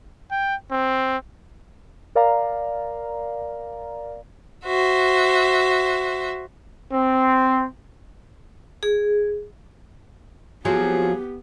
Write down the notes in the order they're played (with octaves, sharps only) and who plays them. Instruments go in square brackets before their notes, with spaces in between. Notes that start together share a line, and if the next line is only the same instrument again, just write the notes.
[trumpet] G5
C4
[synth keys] A#4 D5 F5 A#5
[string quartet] F#4 C5 E5
[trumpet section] C4
[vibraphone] G#4
[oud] F3 F#3 C4 [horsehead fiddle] B3 G4 [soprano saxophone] G#4